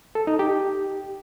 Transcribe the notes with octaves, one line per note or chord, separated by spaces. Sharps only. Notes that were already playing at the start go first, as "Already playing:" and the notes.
A4
D#4
G4